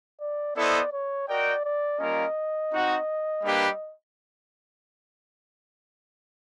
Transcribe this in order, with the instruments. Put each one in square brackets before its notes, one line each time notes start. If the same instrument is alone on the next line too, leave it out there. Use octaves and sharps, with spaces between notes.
[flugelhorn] D5
[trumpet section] B3 E4 A4 C5 D#5 [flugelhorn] D5
[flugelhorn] C#5
[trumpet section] F#4 A#4 D#5 G5 [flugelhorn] D5
[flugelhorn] D5
[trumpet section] G3 A#3 C#4 F4 A#4 [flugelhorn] D#5
[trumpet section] C4 D#4 F#4
G3 A#3 D4 G4 B4